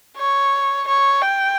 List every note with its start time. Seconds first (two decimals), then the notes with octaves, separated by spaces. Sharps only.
0.17 C#5
0.87 C#5
1.22 G5